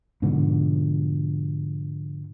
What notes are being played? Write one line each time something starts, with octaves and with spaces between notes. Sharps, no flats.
G#2 B2 D3 F3